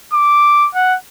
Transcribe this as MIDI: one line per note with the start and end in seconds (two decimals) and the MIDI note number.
0.13 0.68 86
0.75 0.96 78